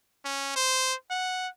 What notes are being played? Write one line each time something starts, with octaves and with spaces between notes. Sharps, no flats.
C#4
C5
F#5